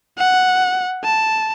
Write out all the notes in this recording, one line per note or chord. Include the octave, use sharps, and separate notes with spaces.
F#5
A5